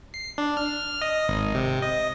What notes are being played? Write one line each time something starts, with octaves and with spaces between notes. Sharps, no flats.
C7
D4
F6
D#5
G#1
C3
D#5